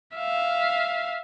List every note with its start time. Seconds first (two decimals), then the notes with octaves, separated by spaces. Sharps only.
0.16 E5 F5